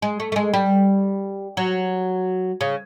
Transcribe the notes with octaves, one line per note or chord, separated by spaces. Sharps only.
G#3
A3
A3
G#3
G3
F#3
C#3